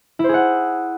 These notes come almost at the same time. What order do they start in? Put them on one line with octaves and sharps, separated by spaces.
E4 C5 G#4 F#5